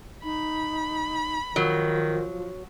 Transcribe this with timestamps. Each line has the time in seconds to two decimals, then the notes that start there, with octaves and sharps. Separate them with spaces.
0.24 D#4 B5
1.56 D#3 F3 F#3